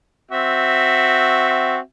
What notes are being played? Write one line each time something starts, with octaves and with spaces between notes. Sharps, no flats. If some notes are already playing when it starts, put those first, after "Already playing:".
C4 F#4 E5